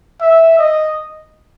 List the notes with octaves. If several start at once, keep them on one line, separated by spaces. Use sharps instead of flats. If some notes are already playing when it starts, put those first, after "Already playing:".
E5
D#5